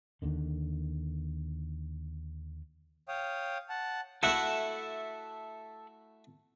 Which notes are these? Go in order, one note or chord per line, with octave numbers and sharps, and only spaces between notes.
D#2 D3 D#3
C#5 F5 G5 D#6
F#5 A5
A3 E4 F#4 A4 E5 F#5